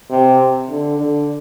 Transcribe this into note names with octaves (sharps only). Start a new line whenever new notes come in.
C3
D3
D3